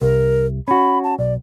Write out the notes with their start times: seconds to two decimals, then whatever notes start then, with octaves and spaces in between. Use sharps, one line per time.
0.01 C2 A#4
0.68 C#4 F#4 B5
1.04 A5
1.19 B1 D5